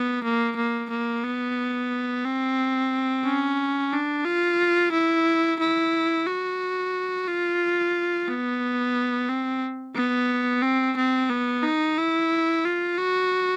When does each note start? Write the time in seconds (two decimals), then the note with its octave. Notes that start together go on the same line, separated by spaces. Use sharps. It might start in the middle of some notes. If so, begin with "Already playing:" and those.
Already playing: B3
0.24 A#3
0.56 A#3
0.90 A#3
1.24 B3
2.25 C4
3.25 C#4
3.93 D4
4.25 F4
4.92 E4
5.60 E4
6.27 F#4
7.28 F4
8.28 B3
9.29 C4
9.96 B3
10.62 C4
10.97 C4
11.30 B3
11.63 D#4
11.98 E4
12.65 F4
12.98 F#4